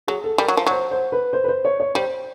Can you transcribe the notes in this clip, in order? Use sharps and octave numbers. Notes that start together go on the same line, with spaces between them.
F#3 G#4
A4
G3 A#4
F#3
F3
F#3 C5
C5
B4
C5
B4
C5
C#5
C#5
G3 C5